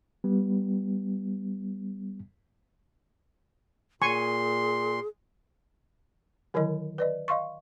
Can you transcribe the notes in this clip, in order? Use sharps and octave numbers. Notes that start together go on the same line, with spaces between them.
G3 B3
A#2 G#4 G#5 C6 C#6
D3 D#3 F#3 E4 A#4 D#5
B4 D5 D#5
D#5 F5 C6 C#6